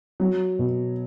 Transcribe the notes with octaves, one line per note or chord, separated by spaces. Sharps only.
F#3
B2